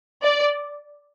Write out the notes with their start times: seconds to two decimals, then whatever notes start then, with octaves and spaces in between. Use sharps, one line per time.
0.23 D5